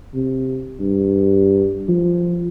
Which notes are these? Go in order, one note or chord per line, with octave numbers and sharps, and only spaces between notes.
C3
G2
F3